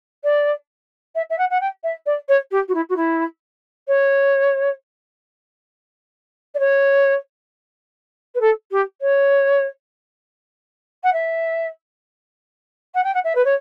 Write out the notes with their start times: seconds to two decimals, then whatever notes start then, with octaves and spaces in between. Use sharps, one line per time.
0.23 D5
1.15 E5
1.29 E5
1.38 F#5
1.50 F#5
1.60 G5
1.83 E5
2.06 D5
2.28 C#5
2.51 G4
2.68 F#4
2.74 E4
2.89 F#4
2.96 E4
3.87 C#5
6.54 D5
6.59 C#5
8.34 B4
8.40 A4
8.71 G4
9.01 C#5
11.03 F#5
11.12 E5
12.94 F#5
13.03 G5
13.14 F#5
13.24 E5
13.35 B4
13.44 C#5